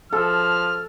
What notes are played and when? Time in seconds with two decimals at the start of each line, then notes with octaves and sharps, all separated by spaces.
0.13 F3 A4 F6